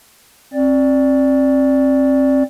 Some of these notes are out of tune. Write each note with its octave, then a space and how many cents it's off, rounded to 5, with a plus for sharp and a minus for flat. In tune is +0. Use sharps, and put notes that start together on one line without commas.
C4 +30 D5 +0